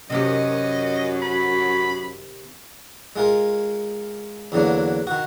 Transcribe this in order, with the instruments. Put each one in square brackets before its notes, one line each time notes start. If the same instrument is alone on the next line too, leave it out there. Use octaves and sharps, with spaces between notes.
[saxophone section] F#2 [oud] C3 D#3 G4 [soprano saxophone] D#5
[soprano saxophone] B5
[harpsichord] G#3 F4 A#4
E2 D3 F#3 A#3
D#3 F#4